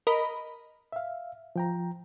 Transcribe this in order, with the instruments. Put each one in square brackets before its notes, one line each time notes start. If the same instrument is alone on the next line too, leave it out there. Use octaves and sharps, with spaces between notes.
[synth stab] A#4 D#5 B5
[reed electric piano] E5 F5
F3 G5 A#5